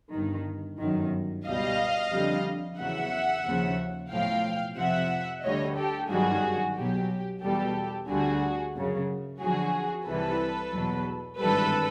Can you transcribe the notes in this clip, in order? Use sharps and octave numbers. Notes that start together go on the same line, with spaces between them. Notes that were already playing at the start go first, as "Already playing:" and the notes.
G1 G2 D#3
G1 F#2 D#3
C#2 B2 G3 D#5 F5
F2 D3 G3
E2 C#3 F#3 E5 F#5
D#2 C#3 F3
B1 A2 F3 F5 G5
F2 C3 F3 E5 F#5
D2 D3 G3 C#5 D#5
G4 A4
G1 F#2 D#3 G3 F#4 G#4
B1 B2 F#3 G4
E2 B2 G3 G4 A4
D2 D3 G3 F#4 G#4
F#2 C#3 F#3
F2 D3 F#3 F#4 G#4
C2 C3 E3 G3 A4 B4
E2 B2 F#3
G#1 G2 E3 G3 A4 B4